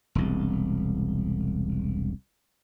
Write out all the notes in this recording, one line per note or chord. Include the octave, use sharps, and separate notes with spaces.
E1 C2